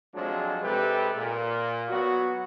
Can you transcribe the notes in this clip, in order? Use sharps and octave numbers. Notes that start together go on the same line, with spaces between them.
F2 F3 F#3 G#3 D4
C3 G#3 G4 A4 B4
A#2
F#3 B3 F#4